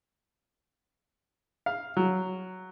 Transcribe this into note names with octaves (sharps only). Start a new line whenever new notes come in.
F5
F#3